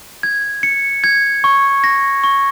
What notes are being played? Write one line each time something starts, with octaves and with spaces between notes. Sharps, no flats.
G#6
C#7
G#6
C#6
A#6
C#6